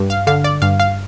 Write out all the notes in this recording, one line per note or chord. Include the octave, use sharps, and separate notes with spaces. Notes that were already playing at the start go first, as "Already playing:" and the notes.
Already playing: G2
F5
D3 F5
D5
G2 F5
F5